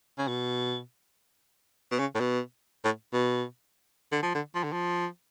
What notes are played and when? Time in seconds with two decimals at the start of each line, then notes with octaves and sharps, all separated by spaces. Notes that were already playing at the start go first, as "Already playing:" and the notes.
0.18 C#3
0.28 B2
1.92 B2
1.99 C#3
2.15 A2
2.20 B2
2.85 A2
3.13 B2
4.12 D3
4.23 F3
4.35 D3
4.55 F3
4.64 D3
4.73 F3